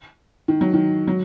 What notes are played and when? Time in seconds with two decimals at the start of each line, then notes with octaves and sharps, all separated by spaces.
0.48 D#3
0.61 F#3
0.73 D#3
1.07 F#3